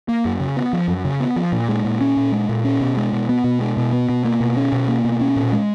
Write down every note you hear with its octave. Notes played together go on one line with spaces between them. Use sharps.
A#3
F#2
C#3
B3
F3
F#2
C#3
B3
F3
A#2
G#3
A#2
C#4
A#2
G#3
A#2
C#4
B2
G#3
B2
B3
B2
G#3
B2
B3
B2
A#3
B2
C#4
B2
A#3
B2
C#4
A#2
G#3